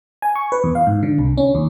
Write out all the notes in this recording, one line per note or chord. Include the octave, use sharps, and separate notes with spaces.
G#5
C#6
B4
E2
F5
G#2
D3
C2
C#4
D#2